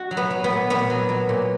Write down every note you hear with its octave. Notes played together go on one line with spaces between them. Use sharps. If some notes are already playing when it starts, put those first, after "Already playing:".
Already playing: F#4
F#3
B3
F#3
B3
A#2
A#2 B3
F#3
F#3
A#2